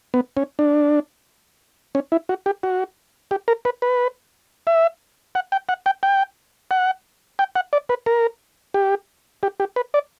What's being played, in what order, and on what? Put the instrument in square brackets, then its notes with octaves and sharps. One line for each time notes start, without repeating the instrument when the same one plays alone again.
[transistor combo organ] B3
C#4
D4
C#4
E4
F#4
G4
F#4
G4
A#4
B4
B4
E5
F#5
G5
F#5
G5
G5
F#5
G5
F#5
D5
B4
A#4
G4
G4
G4
B4
D5